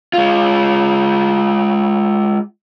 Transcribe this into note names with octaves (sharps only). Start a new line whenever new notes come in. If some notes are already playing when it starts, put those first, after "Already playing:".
G#3 F4